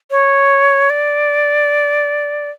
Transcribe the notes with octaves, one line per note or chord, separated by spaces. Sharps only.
C#5
D5